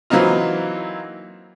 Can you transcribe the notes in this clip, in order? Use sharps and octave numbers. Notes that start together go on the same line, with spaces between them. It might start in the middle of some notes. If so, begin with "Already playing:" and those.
E3 F#3 A#3 C4 D#4 F4